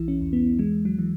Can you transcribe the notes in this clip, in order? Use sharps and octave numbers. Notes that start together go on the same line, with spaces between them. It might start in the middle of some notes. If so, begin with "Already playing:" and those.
Already playing: B1 E3 E4
C#4
E2
B3
E3 G#3
F#3
E3